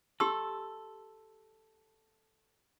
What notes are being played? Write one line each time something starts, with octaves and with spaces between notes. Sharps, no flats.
G4 A4 C6 E6